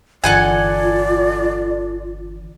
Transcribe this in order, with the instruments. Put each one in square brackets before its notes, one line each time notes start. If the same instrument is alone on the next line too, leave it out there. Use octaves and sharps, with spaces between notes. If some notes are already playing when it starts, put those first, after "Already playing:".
[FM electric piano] G1 D3 E3 [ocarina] F4 [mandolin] A4 F#5 G#5 [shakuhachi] D5